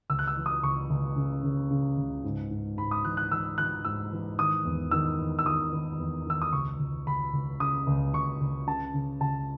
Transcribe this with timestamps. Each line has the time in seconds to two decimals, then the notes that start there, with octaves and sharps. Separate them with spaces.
0.09 C#2 E6
0.19 F#6
0.27 E6
0.37 E3
0.46 D#6
0.63 C#2 C#6
0.90 C#2
1.16 C#3
1.43 C#3
1.71 C#3
1.97 C#2
2.24 G#2
2.51 G#2
2.77 G#2 B5
2.91 D#6
3.05 E3 F#6
3.17 F#6
3.31 E3 E6
3.58 E3 F#6
3.85 G#2 E6
4.12 E3
4.38 D#3 D#6
4.65 E2
4.91 D#3 E6
5.19 E2
5.39 E6
5.46 D#3 D#6
5.73 D#3
5.99 E2
6.26 D#3 E6
6.42 D#6
6.53 C#2 C#6
6.79 C#2
7.07 C#2 B5
7.33 C#2
7.60 C#3 D#6
7.87 C#2
8.14 C#2 C#6
8.41 C#2
8.67 C#3 A5
8.94 C#3
9.21 C#2 A5